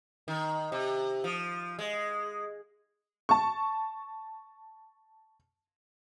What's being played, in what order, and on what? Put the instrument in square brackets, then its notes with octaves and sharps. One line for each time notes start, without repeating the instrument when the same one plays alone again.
[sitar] D#3
C3
F3
G#3
[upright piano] A5 C#6